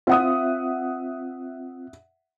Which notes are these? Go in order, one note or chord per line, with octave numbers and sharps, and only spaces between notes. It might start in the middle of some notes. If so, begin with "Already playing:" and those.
C4 F4 E5 F#5 D#6